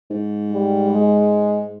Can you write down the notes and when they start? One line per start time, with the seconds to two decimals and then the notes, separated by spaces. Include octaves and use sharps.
0.10 G#2
0.51 G3
0.91 G#3